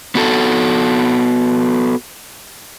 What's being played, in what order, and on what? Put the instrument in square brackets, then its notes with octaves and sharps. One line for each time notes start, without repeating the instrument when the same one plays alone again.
[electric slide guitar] B3 F#4 A4